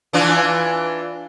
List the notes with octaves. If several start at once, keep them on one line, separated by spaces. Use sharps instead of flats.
E3 D4 F4